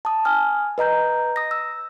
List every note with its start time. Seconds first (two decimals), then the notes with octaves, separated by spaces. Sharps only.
0.05 A5 D#6
0.25 G#5 D#6 F6
0.78 B4 D#5 A#5 G6
1.36 D#6 A#6
1.51 E6